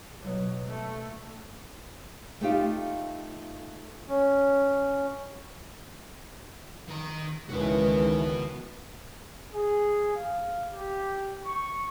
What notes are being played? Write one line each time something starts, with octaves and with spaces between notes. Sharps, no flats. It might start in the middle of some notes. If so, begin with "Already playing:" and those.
B2 F#3
A3
A3 D#4 F4 G4 F5
C#4
D#3 A#5
C#2 D#3 E3 F#4 B4
G#4
F5
G4
C#6